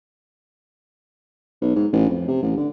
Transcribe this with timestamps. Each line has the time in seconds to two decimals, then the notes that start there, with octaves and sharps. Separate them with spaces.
1.61 B1
1.75 G#2
1.93 A1
2.10 F2
2.28 C3
2.42 A1
2.57 D3